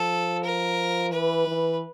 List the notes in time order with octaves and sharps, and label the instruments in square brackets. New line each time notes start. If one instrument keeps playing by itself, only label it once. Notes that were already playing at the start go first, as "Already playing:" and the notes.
Already playing: [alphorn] F3 [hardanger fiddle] A4
[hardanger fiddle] A#4
[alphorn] E3 [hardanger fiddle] B4
[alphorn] E3